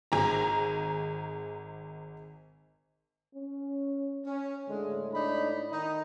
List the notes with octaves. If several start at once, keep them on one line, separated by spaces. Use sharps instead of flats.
G#1 G#4 A#5
C#4
C#4
A2 D3 G#3
D4 D#4 B5
D#3 D#4